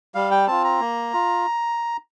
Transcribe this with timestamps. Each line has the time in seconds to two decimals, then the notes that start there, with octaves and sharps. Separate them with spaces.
0.15 G3 F5
0.31 G5
0.48 C4 F4 A5
0.64 A#5
0.80 A#3
1.13 F4